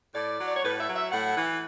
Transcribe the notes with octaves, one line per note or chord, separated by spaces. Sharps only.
A2 D5
F#3
D5
C#5
A2 B4
E5
F#3
E5
A2 F#5
E3